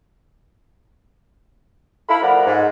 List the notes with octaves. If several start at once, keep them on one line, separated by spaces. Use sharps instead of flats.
E4 A4 F5 B5
F3 A3 A#4 D5 F#5
G#2